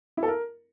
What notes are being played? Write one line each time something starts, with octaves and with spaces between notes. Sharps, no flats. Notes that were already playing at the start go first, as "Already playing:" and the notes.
E4
A4
A#4